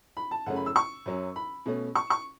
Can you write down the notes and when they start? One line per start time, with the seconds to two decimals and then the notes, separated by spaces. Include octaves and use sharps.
0.17 B5
0.31 A5
0.46 F#2 C#3 A3 C#4 F#5
0.56 B5
0.66 E6
0.76 C#6
1.06 F#2 F#3 C#4
1.36 B5
1.66 B2 A3 C#4
1.95 C#6
2.10 C#6